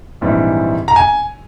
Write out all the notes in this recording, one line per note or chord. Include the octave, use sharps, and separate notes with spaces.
A#1 G#2 E3 G3 C4
A#5
G#5